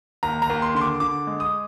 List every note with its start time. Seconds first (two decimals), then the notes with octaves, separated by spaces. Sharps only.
0.23 D#2 A#5
0.42 A#5
0.50 D#2
0.62 C6
0.75 D3 C6
0.81 D6
1.00 D3 D6
1.27 G#3
1.40 D#6